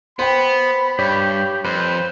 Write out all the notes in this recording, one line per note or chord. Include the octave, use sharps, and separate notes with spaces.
B3 C5 G5 B5
G2 G4 C#5
F2 B4 C5